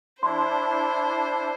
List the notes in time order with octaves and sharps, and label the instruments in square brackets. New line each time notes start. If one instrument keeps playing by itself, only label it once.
[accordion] D4 E4 [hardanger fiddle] C5 [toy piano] C6